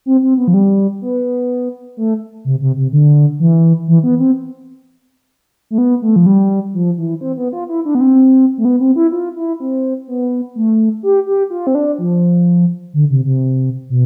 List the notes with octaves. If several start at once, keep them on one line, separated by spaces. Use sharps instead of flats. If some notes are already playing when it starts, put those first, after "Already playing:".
C4
C4
B3
F3
G3
B3
A3
C3
C3
C3
D3
E3
E3
B3
C4
A3
B3
A3
F3
G3
F3
E3
C4
B3
F4
E4
D4
B3
C4
A3
B3
C4
E4
F4
E4
C4
B3
A3
G4
G4
F4
C4
D4
F3
D3
C3
C3
B2